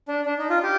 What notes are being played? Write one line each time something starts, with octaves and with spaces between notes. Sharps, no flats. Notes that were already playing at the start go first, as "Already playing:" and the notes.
D4
D4
D#4
F4
G4